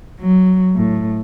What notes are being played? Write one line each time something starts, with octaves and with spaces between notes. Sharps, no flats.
F#3
A2